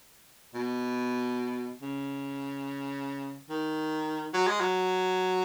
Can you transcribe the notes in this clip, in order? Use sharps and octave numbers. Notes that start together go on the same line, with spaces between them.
B2
C#3
D#3
F#3
G#3
F#3